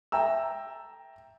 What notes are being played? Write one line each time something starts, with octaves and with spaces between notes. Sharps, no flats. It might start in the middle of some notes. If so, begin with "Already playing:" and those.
E5 G5 A5 A#5 E6